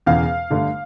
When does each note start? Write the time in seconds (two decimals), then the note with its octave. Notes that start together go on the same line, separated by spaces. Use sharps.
0.06 E1 E2 C#3 E3 F5
0.50 G1 G2 D3 A3